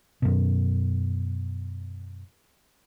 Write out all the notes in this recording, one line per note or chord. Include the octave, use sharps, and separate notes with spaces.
F#2 B2